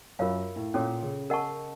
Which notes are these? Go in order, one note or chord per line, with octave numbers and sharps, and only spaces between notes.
F#2 F4 A#4 C#5 F5
A2
A#2 C#4 A4 C#5
C#3
A#4 D#5 F#5 A5 C#6